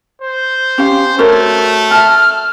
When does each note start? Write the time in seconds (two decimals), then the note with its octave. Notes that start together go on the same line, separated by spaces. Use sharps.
0.21 C5
0.78 C#4 G4 F5
1.19 A3 F#4 A#4 C#5
1.91 E5 A5 F6